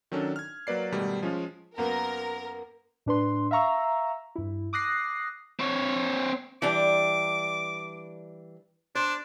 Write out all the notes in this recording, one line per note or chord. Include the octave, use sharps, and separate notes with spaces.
D#3 F#3 C#4 D4 A4
F6 G#6
F#3 A#3 B4 D5 C7
G#2 B2 D#3 G3 A3
F3 G#3 C#4 F4
F#2 A#3 B3 A#4
A2 D4 B4 C6
E5 F5 A#5 C#6 E6
G2 E4
D6 D#6 F#6 A#6 C7
C4 C#5
E3 G3 D4 D6
D4 C5